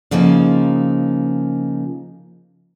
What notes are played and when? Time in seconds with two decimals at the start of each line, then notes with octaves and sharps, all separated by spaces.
0.11 C#3 F3 A#3 D#4